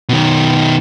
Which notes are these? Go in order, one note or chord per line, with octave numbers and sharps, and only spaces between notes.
B2 D#3